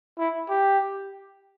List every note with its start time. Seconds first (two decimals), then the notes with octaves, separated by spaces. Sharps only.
0.19 E4
0.50 G4